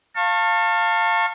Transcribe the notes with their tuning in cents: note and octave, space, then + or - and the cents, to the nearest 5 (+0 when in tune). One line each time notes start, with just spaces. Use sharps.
F5 +0 A5 +30 C#6 -25